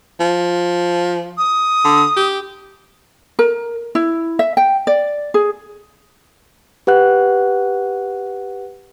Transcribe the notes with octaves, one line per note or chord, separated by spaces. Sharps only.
F3
D#6
D3
G4
A#4
E4
E5
G5
D5
G#4
G4 B4 F#5 F#6